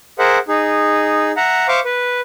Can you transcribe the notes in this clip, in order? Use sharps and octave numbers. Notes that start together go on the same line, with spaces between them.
G#4 A#4 C5 E5 F#5
D#4 G#4
E5 F#5 A#5
C5 E5 F5 C#6 D6
B4